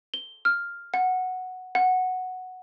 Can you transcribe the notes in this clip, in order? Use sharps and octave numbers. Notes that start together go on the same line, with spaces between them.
G7
F6
F#5
F#5